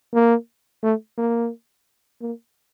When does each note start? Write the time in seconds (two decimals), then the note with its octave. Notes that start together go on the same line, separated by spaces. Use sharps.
0.14 A#3
0.83 A3
1.18 A#3
2.22 A#3